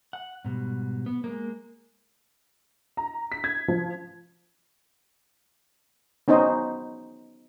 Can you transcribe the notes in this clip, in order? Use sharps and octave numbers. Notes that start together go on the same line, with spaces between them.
F#5
G#2 B2 G3
B3
G#3 A#3
A#5
B6
G#6
F3
B3 C#4 D#4 C5 D#5